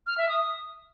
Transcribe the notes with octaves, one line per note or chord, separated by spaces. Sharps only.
F6
E5
D#6